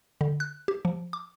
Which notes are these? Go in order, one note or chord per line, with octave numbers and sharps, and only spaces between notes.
D3
F#6
G4
F3
D6